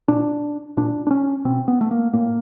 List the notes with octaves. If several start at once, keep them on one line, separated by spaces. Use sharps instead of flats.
A#2 D4
A#2 D4
D4
C#4
B2 C4
B3
A3
A#3
A2 A#3